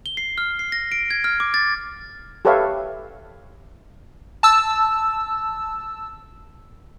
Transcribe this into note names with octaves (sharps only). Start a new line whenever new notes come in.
G7
C7
F6
C7
A#6
D7
G#6
F6
D6
A6
G4 A4 B4 C#5 E5 F5
A5 E6